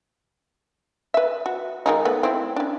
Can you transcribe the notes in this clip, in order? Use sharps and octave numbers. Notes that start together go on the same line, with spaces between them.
B4 E5
F#4
D#3 G#3 D#4
A3 B3
C4 E4
C#4 D4